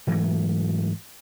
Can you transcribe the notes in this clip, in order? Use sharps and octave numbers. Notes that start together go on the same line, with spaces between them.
G#2 E3 F#3 A3